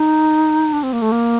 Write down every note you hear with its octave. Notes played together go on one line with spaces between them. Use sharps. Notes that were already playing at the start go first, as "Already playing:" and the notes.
Already playing: D#4
D4
C4
A#3
A3
A#3